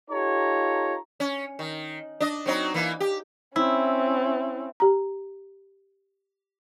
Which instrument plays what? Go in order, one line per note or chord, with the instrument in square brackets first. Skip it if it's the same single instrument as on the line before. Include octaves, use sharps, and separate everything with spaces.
[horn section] D#4 F4 G4 A4 C#5 A#5
[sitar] C#4
D#3
D4 D#5
F#3 C4 D#4
E3 A#3
G4
[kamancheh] C4 C#4 [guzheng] E4
[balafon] G4 A#5